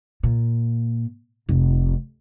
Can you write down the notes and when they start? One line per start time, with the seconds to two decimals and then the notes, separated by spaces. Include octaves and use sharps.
0.23 A#2
1.49 F1